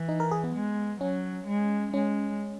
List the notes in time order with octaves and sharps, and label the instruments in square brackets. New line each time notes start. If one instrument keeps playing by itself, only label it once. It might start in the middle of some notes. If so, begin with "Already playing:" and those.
Already playing: [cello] E3
[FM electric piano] D#4
A#4
G#4
B3
[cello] G#3
[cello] F#3 [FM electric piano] C#4
[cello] G#3
[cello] G#3 [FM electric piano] C#4